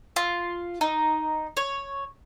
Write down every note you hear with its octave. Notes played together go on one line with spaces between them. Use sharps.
F4
D#4
C#5